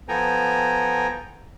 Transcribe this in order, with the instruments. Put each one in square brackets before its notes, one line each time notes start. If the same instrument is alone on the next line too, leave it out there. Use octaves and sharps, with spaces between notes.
[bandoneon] F3 B3 A4 G5 G#5 A#5